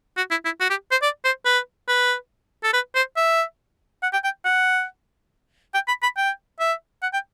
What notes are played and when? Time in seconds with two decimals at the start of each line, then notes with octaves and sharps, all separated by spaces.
0.17 F#4
0.31 E4
0.45 E4
0.60 F#4
0.70 G4
0.91 C5
1.02 D5
1.24 C5
1.45 B4
1.88 B4
2.64 A4
2.73 B4
2.95 C5
3.17 E5
4.03 F#5
4.13 G5
4.24 G5
4.45 F#5
5.74 G5
5.88 B5
6.03 B5
6.17 G5
6.60 E5
7.02 F#5
7.13 G5